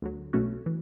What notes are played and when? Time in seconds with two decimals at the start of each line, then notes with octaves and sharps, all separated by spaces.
0.02 D2 D3 F#3
0.33 B1 B2 A3 C#4 F#4
0.66 E3